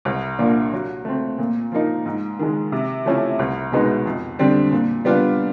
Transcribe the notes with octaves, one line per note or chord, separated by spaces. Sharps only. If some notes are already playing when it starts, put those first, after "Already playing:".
C2
A#2 F3 A#3 D4
F#3
A3 C4
A#2
F3 A#3 D#4
G#2
D#3 G#3
C3
F3 A3 C#4 E4
C2
B2 G#3 B3 D#4
F2
D3 G3 C4
A#2
G3 B3 D4 F4